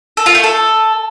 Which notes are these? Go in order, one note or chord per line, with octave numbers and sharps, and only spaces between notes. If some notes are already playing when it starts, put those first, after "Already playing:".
A4
F4
A3
A4